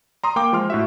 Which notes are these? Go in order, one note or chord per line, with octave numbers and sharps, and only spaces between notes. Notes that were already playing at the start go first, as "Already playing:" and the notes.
A#5 C6 D#6
A#3 G5 D6
F3 G#3 C6 F6
A2 F#4 E5